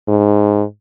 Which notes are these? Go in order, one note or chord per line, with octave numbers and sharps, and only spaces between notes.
G#2